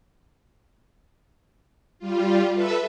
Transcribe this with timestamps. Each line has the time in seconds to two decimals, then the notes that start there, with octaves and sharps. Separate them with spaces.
1.99 G3 F4
2.54 A4 B4 E5